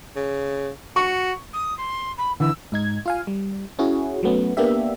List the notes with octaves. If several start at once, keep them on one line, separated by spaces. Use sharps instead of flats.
C#3
F#4 C#6
D#6
C6
B5
D3 E3 E6
G#2 D#4 G#6
F4 F5 G#5
G3
C#4 E4 F#4 G#4
F#3 A3 B3 C#4
A#3 B3 D4 G4 E5